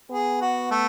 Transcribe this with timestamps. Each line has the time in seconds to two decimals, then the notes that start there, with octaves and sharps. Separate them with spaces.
0.11 B3 G#4
0.41 F#4
0.71 A3